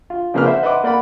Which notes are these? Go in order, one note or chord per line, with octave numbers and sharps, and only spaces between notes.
F4
C#3 F3 A#3 C4 B4 F6
C5 E5 F#5
B4 D#5 E5 F#5 C6 D6
A#3 D5 F#5 B5